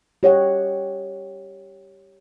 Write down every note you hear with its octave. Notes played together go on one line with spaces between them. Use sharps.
G4 C#5 D#5 F#5